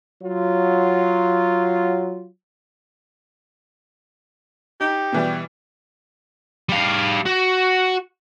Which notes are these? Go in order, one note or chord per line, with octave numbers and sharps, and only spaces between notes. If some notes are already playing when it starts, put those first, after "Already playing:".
F#3 F4
D#4 G4
B2 E3 G3
G3 F5
F#4